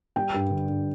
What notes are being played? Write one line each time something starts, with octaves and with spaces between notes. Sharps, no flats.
G3 G5
G2
D3
G2